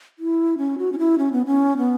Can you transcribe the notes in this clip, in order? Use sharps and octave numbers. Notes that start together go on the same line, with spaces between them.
E4
C#4
F#4
C#4
E4
C#4
B3
C#4
B3